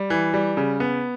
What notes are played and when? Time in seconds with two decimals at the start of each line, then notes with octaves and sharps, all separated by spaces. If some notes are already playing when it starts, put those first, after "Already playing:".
Already playing: G3
0.10 E3
0.34 G3
0.57 C#3
0.80 B3